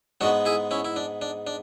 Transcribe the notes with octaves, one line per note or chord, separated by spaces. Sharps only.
G#2 G#3 B3 D4 F#4
E4 G#4
C#4 E4
E4
D4
D4
D4